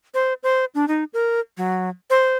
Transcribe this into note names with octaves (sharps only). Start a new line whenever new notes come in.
C5
C5
D4
D#4
A#4
F#3
C5